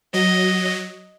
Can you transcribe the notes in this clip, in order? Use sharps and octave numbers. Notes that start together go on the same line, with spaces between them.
F#3 D#5